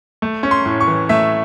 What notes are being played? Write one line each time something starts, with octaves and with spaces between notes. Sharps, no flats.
A3
C#4
C6
A2
C#6
E3
A3 E5